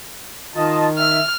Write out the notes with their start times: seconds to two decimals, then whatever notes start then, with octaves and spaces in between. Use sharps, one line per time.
0.55 D#3 F4 D#5 A5
0.99 E5 F6